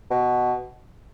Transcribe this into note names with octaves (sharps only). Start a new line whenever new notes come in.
B2